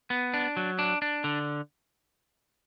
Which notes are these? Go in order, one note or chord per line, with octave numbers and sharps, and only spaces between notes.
B3
D4
F#3
D4
D4
D3